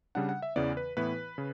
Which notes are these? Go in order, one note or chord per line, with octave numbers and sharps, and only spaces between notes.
C#3 G3 D4 F#5
F#5
E5
E2 C#3 E3 B3 D5
B4
A2 E3 B3 E4 B4
C#3